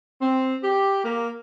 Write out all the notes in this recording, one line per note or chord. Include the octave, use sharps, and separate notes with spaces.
C4
G4
A#3